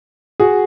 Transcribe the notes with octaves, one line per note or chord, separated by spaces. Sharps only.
F#4 G#4